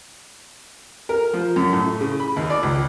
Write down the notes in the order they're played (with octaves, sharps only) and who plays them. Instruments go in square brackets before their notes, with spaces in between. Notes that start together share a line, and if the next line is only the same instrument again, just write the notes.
[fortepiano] A#4
F3
F#2
A2
C#3
B5
D#2
D5
C#2